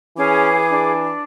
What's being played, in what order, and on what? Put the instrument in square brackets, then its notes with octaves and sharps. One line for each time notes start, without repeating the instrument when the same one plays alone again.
[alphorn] E3 [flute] C#4 [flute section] G#4 D6
[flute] D4